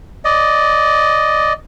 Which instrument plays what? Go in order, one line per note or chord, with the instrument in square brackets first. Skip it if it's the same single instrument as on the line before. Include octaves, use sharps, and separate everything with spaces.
[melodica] D5 D#5